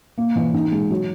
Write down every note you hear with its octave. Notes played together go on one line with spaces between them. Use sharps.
A#3
E3
D#4
G#3
F#3